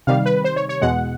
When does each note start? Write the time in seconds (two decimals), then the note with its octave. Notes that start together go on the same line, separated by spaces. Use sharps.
0.07 C3 D#3 G3 F5
0.26 B4
0.44 C5
0.56 C#5
0.69 C#5
0.81 E2 B2 G#3 F#5